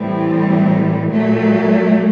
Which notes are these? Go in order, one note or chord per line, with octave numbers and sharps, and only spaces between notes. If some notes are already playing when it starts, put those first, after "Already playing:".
Already playing: A2 E3 G3 C4
A#2 F#3 A3